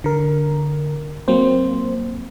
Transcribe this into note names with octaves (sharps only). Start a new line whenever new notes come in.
D3 A#4
F#3 A#3 C4 C5